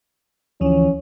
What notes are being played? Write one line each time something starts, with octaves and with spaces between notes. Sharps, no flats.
D2 E3 F3 C#4